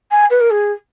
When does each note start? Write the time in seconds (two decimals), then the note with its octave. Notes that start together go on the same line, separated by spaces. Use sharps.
0.11 G#5
0.30 B4
0.40 A#4
0.51 G#4